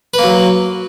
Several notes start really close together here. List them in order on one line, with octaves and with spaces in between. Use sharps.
B4 A#3 F#3